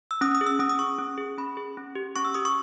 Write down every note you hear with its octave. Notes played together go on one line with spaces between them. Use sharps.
E6
C#4 D#6
D#6
G#4
E6
C#4 D#6
D#6
G#4 C#6
C#4
G#4
C#4 B5
G#4
C#4
G4
C#4 C#6
E6
G4 D#6
C#6